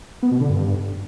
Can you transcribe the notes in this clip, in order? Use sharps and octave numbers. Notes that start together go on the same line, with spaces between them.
B3
B2
D3
G2